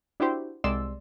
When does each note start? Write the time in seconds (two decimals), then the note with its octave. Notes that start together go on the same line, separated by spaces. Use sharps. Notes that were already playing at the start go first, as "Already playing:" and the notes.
0.20 D4 E4 F#4 G4 C5
0.64 C2 G#3 D5 C6 E6